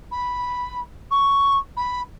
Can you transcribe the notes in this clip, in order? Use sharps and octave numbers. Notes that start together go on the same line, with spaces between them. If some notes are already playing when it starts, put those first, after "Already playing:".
B5
C#6
B5